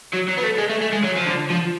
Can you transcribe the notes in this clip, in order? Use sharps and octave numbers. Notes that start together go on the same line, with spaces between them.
F#3
F#3
B3
A3
G#3
A3
A3
G#3
F#3
F3
D3
F3